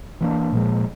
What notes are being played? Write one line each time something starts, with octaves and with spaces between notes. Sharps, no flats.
E3 G3 A#3 D4
A#2 F3 G#3